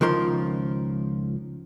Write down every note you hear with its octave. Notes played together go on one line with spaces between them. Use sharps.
C#2 D#3 F3 A#4 C6